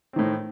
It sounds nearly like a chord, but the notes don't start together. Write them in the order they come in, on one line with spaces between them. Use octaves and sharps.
C4 D#3 A2